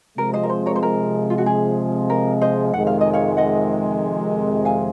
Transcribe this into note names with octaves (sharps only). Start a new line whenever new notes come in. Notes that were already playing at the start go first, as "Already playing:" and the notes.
C3 F3 G#3 A#4
C5 D#5
A#4
C5
A#4 C#5
C5
A#4
F4
F#4
G#4
A#4
C5 D#5
F2 C3 D#3 G#3 F#5
F5
D#5
C#5 F5
D#5 F#5
F5 G#5